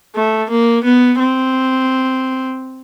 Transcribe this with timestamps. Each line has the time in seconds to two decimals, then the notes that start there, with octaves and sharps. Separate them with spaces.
0.15 A3
0.50 A#3
0.84 B3
1.19 C4